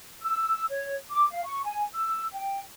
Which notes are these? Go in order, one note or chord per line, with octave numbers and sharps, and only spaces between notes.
E6
C#5
D6
F5
C#6
G#5
E6
G5